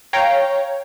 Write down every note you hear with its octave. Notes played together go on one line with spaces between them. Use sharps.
C#5 F5 G5 A#5